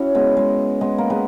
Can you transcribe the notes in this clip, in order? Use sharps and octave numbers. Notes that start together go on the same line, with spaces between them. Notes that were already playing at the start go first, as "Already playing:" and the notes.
Already playing: C#4 E4 F#4
G#3 B3
G#3
G#3 B3
A#3
G#3 B3